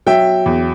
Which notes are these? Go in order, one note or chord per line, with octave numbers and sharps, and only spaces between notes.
F#3 E5 G5
E2